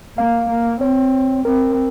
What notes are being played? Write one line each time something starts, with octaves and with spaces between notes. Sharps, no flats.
A#3 F5
A#3
C4 C#5
C4 A#4